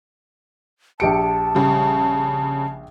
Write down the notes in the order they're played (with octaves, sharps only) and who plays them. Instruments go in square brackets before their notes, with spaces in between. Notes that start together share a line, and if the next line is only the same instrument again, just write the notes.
[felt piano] A#1 G4 D7 [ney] A5 [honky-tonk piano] C#7
[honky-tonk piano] C#3 G3